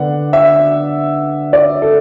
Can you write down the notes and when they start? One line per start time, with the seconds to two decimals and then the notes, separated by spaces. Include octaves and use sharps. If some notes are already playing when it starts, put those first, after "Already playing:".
Already playing: D3 B3 D4 F#5
0.33 E5
1.53 D5
1.82 A4